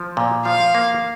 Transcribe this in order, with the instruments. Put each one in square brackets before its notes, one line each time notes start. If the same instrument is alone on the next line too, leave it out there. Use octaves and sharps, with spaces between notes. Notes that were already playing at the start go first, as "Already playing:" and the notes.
Already playing: [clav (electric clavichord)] F3
A#2
[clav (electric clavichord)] F3 [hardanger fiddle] F5
[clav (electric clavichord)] A#3